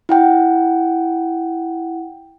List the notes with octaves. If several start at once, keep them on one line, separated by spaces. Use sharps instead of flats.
E4 F#5 G5